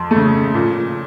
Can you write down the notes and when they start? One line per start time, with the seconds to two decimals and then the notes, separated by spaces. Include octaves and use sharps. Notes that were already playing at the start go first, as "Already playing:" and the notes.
Already playing: F2 C6
0.11 A3
0.16 C#3
0.54 A#2